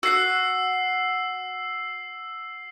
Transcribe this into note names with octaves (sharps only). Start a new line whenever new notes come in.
F#4 F#5 E6 C7